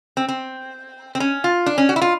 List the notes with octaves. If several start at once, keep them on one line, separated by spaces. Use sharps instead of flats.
C4
C4
C4
C#4
F4
D4
C#4
F#4
E4
F4